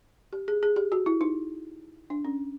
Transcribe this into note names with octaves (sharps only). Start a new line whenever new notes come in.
G4
G#4
G#4
G4
F#4
E4
D#4
D4
C#4